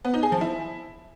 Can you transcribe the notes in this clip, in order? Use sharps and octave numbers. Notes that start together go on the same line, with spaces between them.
B3
D#4
G#4
F3
E4